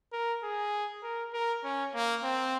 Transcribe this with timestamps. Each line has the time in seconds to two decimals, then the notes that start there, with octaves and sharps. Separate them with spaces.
0.13 A#4
0.43 G#4
1.03 A#4
1.33 A#4
1.64 C#4
1.94 A#3
2.24 C4